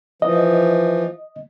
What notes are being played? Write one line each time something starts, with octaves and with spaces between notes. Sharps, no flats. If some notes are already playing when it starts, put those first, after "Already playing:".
E3 F3 D#5